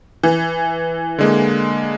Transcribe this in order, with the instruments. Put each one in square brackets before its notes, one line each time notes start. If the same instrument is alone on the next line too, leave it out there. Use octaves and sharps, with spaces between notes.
[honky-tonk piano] E3
[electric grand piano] D3 G#3 A#3